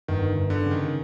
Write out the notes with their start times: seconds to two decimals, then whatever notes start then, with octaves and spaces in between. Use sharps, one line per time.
0.08 G1 D#3
0.36 G1
0.50 D3
0.64 C#3
0.71 D#3